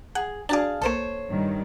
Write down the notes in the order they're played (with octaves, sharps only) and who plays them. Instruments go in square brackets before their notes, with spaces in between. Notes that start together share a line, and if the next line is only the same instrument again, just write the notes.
[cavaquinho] G#4 [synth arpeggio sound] F#5
[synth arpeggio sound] D4 F#4 D5 [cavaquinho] G#4 F5 A5
[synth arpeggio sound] B1 A#3 [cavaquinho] A4 C5 C#5
[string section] G2 D#3